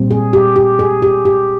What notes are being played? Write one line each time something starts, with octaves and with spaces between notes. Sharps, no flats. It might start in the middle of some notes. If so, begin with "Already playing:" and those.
Already playing: A#2 G3 C4
G#4
G4
G4
G#4
G4
G4